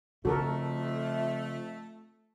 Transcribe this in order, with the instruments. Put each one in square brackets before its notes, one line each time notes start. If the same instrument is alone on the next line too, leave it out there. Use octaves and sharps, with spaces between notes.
[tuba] F2 [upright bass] C#3 [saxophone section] A3 [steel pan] F#4 A4 A#4